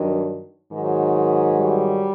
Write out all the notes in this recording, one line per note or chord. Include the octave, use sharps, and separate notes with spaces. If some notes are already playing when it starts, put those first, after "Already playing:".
Already playing: G2 D#3 F#3
G#2 D#3 F#3
G3